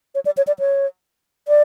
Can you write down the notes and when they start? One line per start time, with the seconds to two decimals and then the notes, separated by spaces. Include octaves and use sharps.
0.15 C#5
0.26 D5
0.37 C#5
0.47 D5
0.59 C#5
1.48 D5